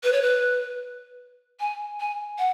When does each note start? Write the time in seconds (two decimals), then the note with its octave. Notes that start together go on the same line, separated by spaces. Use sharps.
0.03 B4
0.13 C#5
0.22 B4
1.60 G#5
2.00 G#5
2.38 F#5